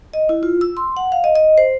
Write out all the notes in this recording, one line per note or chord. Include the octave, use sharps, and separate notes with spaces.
D#5
E4
F4
E6
C6
F#5
F5
D#5
D#5
C5